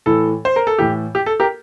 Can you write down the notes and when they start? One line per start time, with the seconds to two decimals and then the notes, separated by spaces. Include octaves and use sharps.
0.06 A2 E3 A4
0.45 C5
0.56 A#4
0.67 A4
0.78 A2 E3 G4
1.15 G4
1.26 A4
1.40 G4 A#4